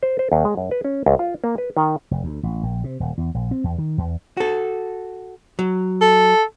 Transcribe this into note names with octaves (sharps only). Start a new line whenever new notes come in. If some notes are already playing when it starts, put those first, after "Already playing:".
C5
C5
D#2
G#3
F#2
B4
C#4
C#2
F4
A#3
B4
D#3
F1
D2
A1
A#1
C3
D#1
E2
A#1
C4
E2
D#3
E2
F#4 A4
F#3
A4